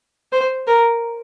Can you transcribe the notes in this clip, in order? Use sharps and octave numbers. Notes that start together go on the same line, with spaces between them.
C5
A#4